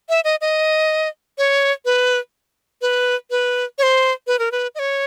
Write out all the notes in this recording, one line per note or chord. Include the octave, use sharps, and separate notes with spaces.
E5
D#5
D#5
C#5
B4
B4
B4
C#5
C5
B4
A#4
B4
D#5
C#5